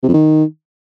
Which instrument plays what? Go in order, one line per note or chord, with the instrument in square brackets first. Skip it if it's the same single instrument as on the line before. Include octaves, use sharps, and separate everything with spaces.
[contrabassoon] C3
F2
D#3